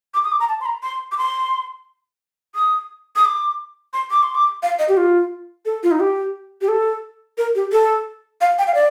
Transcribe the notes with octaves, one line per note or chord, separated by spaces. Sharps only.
D6
D#6
D6
A#5
A5
C6
A#5
C6
D6
C6
D#6
D#6
D6
C6
D6
C6
D6
F5
D#5
G4
F4
A4
F4
D#4
G4
G4
A4
A#4
G4
A4
F5
G5
F5
D5